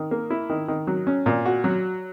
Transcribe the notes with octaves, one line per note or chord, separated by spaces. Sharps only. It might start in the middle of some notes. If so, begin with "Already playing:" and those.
Already playing: D#3
A#3
E4
D#3
D#3
F#3
C#4
A#2
F#4
F#3